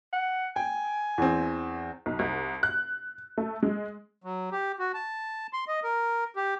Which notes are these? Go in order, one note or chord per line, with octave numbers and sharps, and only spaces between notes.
F#5
G5 G#5
E2 C4
B1
C2
F#6
A3
G#3
F#3
G4
F#4
A5
C6
D#5
A#4
G4